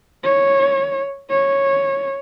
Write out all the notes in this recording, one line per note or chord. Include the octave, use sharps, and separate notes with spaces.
C#5
C#5